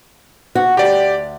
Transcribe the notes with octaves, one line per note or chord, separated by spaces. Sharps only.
F#4
D2 G4 D5